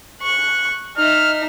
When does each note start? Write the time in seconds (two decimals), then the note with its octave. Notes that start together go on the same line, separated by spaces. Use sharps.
0.22 C#6 F#6
0.97 D#4 E5 F6